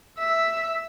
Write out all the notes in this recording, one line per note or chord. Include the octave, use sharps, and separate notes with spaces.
E5